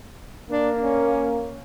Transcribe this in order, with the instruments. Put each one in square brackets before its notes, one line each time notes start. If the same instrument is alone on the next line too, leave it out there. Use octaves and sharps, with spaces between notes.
[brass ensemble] A#3 [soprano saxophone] D4
[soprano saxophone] C#4